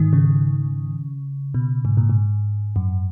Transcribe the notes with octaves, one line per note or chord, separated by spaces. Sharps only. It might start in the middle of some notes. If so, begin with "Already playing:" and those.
Already playing: G#2 D#3
C#3
B2
G#2
A#2
G#2
F#2